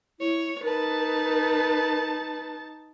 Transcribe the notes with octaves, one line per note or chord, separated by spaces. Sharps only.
E4 C#5
D#4 A#4 B4 A5